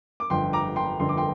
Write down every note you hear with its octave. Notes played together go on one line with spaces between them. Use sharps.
D6
G1 F2 D3 G5 C6
A#5 D6
G5 C6
G1 F2 D3 C6
D6
G5 C6